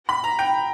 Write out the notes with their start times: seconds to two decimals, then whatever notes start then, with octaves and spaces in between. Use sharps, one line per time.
0.09 B5
0.24 A#5
0.39 G5